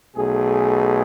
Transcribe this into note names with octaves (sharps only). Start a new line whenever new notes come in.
B1 B2 A3 G#4